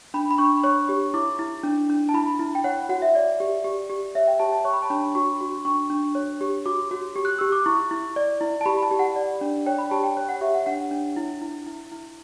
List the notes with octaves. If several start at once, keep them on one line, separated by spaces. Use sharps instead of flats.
D4 B5
B5
D4 C#6
B5
C#5 C#6
G4
E4 D6
E4
D4
D4
A5
E4 B5
E4
G5
C#5 F#5
F#4 F#5
E5
D5
G4
G4
G4
C#5 E5
G5
G4 A5
A5
C#5 C#6
B5
A5
D4 B5
F#4 C#6
F#4
D4 C#6
D4
C#5
G4
F#4 D6
F#4
G4
F#6
G4 E6
D6
E4 C#6
E4
D5
E4
A5
G4 B5
A5
G4
F#5
D5
D4
C#5 G5
B5
G4 A5
G5
C#5
F#5
G4 E5
F#5
D4 F#5
D4
E4
E4
E4
E4